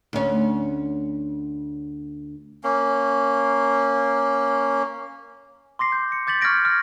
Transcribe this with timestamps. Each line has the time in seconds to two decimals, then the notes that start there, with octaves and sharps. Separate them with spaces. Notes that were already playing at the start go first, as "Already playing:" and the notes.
0.13 D2 C#4
2.64 A#3 C#4
5.79 C6 D6 A#6 C7
5.92 G6
6.12 C#7
6.27 D6 G6 A6 B6 F#7
6.41 C#6 F6 G6 G#6 A#6 D7
6.65 F6